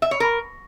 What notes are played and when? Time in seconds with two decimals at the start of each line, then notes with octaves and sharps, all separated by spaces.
0.02 E5
0.11 C#5
0.20 A#4